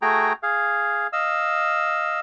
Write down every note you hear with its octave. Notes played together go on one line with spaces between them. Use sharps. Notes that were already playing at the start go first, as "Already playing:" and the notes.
A3 F#4 G#4 G5 A#5
G#4 F5
D#5 F5 E6